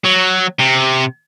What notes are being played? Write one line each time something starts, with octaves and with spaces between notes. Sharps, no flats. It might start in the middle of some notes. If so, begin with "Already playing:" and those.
F#3
C3